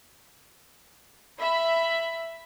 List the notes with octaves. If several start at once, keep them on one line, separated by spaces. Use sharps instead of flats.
E5 B5